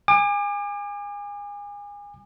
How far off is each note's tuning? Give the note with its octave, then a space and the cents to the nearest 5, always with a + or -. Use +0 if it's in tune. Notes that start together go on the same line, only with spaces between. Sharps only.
G#5 -25 D6 +35